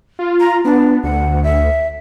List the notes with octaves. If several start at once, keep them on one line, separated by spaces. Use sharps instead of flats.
F4
A#5
B3 D4
D2 F#5
E5